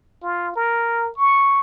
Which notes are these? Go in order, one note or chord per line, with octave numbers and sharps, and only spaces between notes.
F4
A#4
C#6